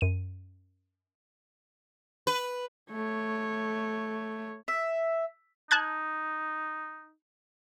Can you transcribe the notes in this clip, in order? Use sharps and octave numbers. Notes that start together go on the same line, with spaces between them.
F#2 D#7
B4
A3 C#5
E5
D#4 A5 F#6 G#6